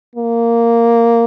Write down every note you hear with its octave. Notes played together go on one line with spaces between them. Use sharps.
A#3